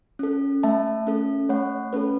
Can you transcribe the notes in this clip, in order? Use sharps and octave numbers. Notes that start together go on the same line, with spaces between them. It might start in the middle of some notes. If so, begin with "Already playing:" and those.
C#4 A4
A3 E5 A5
C#4 A4
A3 C#5 F#5
C#4 A4 B4